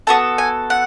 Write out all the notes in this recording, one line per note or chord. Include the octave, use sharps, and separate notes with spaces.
B3 F#4 A4 A5
G#5
F#5